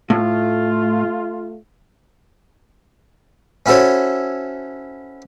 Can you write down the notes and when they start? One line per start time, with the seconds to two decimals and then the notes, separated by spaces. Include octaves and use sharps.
0.10 A2 A3 F4
3.66 C#4 E4 F#4 A4 C5 C#5